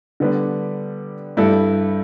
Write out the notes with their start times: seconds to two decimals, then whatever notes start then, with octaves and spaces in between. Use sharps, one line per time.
0.20 D3 G3 B3 D4
1.37 G2 G3 E4 A4